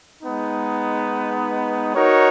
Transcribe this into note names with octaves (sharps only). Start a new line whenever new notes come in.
G#3 B3 D#4
D#4 F#4 A#4 C#5